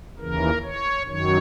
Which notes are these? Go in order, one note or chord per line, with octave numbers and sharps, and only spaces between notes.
D#2 C#3 E3 A#4
C#5
F#2 D#3 F#3 C#5